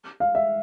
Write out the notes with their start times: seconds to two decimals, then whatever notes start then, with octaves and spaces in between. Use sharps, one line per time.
0.20 F5
0.35 E5